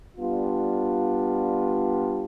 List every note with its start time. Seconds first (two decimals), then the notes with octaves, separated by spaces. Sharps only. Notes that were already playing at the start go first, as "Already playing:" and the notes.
0.16 G3 B3 D4 F4